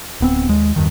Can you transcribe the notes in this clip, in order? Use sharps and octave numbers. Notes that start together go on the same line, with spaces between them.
D1 B3 C4
D#2 G#3
E2 G2 D#3